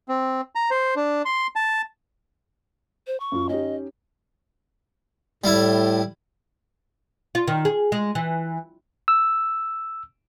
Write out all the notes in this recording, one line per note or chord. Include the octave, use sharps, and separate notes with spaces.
C4
A#5
C5
D4
C6
A5
C5
C#6
F#2 F4
C#4 D#4 G4 D#5
A2 G3 E4
F4
D#3
G#4
G#3
E3
E6